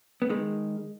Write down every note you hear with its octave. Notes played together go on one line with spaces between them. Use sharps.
B3
D#3 G#3